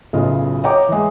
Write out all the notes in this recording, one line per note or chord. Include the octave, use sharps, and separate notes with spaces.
B1 A2 C#3 B3 F4 D#5
C#5 D#5 F#5 G5 A#5 D6
E3 G#3